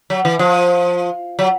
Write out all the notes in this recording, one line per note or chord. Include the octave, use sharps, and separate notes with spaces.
F#3
E3
F3
F#3